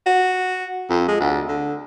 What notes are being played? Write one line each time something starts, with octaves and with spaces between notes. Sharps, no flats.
F#4
F2
G#3
D2
D3